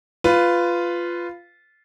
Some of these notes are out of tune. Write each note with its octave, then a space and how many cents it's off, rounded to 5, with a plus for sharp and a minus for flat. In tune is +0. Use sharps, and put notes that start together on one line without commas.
F4 -5 B4 +10